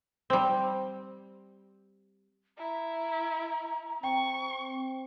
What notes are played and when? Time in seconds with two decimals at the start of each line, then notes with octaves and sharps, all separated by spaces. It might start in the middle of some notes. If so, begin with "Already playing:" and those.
0.30 G3 C4
2.58 E4 A#5
4.04 C4 G5 C#6